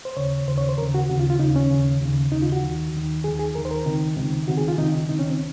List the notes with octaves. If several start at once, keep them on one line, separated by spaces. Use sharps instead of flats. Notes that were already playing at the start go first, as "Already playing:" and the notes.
C5
D#2 C#3 C#5
D#2 C#3 C5
C#5
C5
D#2 C#3 A#4
F#4
D#2 C#3 F#4
F4
F4
D#2 C#3 D#4
C#4
D#2 C#3
D#2 C#3
D#2 C#3 D#4
F4
F#4
D#2 D#3
D#2 D#3
D#2 D#3 G#4
G#4
D#2 D#3 A#4
C5
A#4
C#2 C3 D#3
C#2 C3 D#3
C#2 C3 D#3 F#4
G#4
F4
C#2 C3 D#3 D#4
C#2 C3 D#3 D#4
C#4
C4